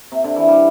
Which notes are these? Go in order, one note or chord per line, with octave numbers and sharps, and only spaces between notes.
C3
D3
E3
G3